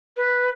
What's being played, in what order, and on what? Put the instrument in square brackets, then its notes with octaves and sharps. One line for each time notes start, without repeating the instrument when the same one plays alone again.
[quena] B4